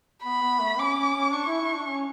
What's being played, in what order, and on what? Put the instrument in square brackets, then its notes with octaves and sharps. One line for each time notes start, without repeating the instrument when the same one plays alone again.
[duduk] B3 [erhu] B5
[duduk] B3
A3
[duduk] C#4 [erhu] D6
[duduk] C#4
C#4
[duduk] D4 [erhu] C#6
[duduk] E4
E4
D4
C#4